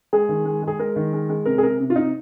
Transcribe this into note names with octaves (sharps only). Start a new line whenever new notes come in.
G#3 G#4
D#3
G#3
G#3
G#4
G#3 A#4
D#3
G#3
G#3
C3 A#4
G#4
C3 A#4
C3
F4
C3 D#4